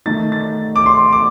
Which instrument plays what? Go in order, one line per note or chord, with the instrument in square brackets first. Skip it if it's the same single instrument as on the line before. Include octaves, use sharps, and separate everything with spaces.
[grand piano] D#3 A3 D#4 A6
A6
D6
C6
D6